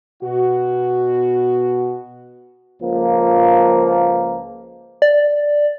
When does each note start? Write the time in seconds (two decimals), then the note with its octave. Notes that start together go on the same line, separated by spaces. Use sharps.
0.23 B2 F#4
2.81 C#2 F3 A#3
5.02 D5